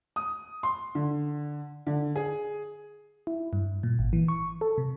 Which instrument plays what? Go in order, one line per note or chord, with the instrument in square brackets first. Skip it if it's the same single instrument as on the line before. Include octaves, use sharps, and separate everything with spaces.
[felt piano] D#6
C6
D3
D3
G#4
[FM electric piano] E4
G2
A#2
G#1
E3
C#6
A4
C3